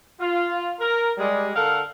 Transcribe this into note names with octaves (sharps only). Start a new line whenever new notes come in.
F4
A#4
G3 G#3
D3 A4 A#4 F5 F#5